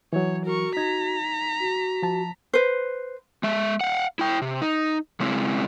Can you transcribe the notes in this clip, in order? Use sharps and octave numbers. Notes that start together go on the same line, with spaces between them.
E3 F#3 C#5
F#4 A#4 C#6
D#4 A#5 G#6 B6
F#4
F3 A5
B4 C5
G#3 E5
F5 F#5
E4 G5
C3
D#4
C#3 G#3 C4 E4